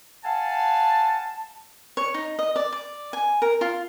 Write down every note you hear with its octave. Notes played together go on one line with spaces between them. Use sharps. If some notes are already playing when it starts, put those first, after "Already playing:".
F5 F#5 G#5 A5
C#5
D#4
D#5
D5
D5
G#5
A#4
F4